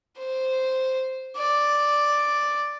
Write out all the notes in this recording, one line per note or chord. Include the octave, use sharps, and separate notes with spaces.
C5
D5